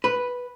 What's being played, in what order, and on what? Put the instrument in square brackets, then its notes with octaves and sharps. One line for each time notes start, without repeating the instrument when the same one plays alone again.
[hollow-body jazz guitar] B4